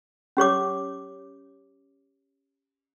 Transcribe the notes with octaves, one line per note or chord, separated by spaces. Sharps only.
C#4 G4 C#5 D6